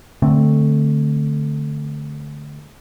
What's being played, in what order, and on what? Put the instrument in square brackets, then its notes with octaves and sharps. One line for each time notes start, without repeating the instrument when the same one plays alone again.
[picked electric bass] D3 A3 C4